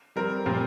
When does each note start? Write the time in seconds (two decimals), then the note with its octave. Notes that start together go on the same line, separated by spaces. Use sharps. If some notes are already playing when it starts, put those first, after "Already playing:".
0.16 G3 C4 A#4
0.46 A#2 G3 C4 A#4